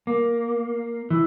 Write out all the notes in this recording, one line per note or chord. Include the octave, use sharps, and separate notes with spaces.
A#3
E3